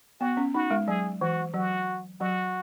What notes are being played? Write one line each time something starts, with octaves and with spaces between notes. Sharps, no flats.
B3 F#4
C#4
D#4 F#4
G#3
F#3 G#4
E3 F#4
F#3 F#4
F#3 F#4